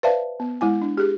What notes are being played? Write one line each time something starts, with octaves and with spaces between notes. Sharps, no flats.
B4 C5 D5 E5 F5 A5
B3
G#3 E4 G#5
D4
G4 G#4